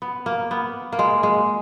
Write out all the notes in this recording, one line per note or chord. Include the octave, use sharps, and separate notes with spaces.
B3
A#3
B3
A#3
G#3
G#3